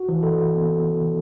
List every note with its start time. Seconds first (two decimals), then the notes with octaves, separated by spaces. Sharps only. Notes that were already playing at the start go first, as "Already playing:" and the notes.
Already playing: F#4
0.09 E3
0.23 A4
0.38 F#4
0.54 B3
0.70 E3
0.85 E3
1.01 E3